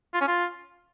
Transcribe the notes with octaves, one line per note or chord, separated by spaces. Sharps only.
F4
C#4
F4